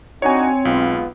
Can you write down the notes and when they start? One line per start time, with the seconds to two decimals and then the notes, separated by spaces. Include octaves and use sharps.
0.22 C4 D4 D#4 F#4 C#5 G#5
0.65 B1 G#3 B3 F4